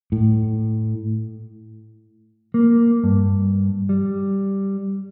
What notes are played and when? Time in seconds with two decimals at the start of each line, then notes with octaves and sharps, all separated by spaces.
0.12 A2
2.54 A#3
3.04 G2
3.89 G3